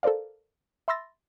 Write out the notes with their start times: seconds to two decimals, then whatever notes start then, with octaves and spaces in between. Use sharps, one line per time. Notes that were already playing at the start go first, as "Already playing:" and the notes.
0.03 A4 A#4 C5 D5 F5
0.88 E5 B5 C6 E6 A6 A#6